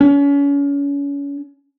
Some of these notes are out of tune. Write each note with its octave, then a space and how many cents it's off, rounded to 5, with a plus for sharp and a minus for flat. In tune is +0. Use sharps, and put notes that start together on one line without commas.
C#4 +35